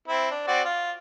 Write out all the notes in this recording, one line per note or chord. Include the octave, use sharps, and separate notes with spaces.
C4 E4
D4
C4 F#4 D5
F4